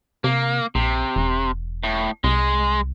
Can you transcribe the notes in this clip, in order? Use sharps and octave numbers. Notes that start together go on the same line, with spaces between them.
C3 A#3
A#1 C3
E1
A2
C2 G#3